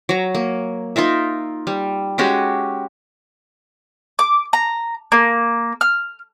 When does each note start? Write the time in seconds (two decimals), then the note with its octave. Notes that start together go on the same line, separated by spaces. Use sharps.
0.09 F#3 A#5
0.35 A#3
0.96 D#4 F4 A#4 E5
1.67 G3
2.18 G#3 C#4 F#4 G4
4.19 D6
4.53 A#5
5.12 A#3
5.81 F6